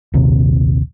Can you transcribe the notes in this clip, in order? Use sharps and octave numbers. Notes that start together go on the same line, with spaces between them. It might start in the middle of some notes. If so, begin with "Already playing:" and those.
A#1 D#2 C3